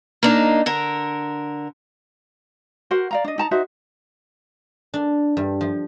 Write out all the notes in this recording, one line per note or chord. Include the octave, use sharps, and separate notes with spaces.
A#3 D4 D#4
D3 A#4
F#4 A#4 C5 F#5
D5 F5 A#5
D4 D#5
D#4 A5 A#5
D#4 F#4 C5 E5
D4
G2
F3